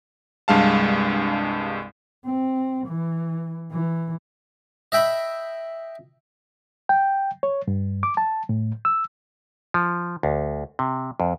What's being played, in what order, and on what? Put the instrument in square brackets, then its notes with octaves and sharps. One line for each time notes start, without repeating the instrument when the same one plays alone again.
[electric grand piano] C2 G2 G#3 F5 A5
[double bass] C4
E3
E3
[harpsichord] D#5 E5 G5 B5
[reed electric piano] G5
C#5
G2
D6
A5
A2
E6
[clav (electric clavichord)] F3
D2
C3
F2